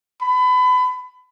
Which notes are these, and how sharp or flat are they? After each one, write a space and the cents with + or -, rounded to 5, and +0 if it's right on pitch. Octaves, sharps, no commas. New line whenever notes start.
B5 +30